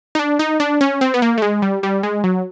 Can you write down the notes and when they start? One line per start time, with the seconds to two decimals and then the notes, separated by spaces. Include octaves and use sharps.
0.15 D#4
0.19 D4
0.39 D#4
0.60 D4
0.81 C#4
1.01 C4
1.14 B3
1.22 A#3
1.38 A3
1.42 G#3
1.62 G3
1.83 G3
2.03 G#3
2.24 F#3